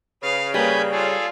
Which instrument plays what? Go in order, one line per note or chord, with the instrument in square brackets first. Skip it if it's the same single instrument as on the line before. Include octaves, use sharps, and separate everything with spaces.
[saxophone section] C#3 [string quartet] B4 F5
[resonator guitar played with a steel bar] G3 [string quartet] A#3 A#4 B4 [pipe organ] G#5 B5 G6
[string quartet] F4 F5 [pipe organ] G#4 A4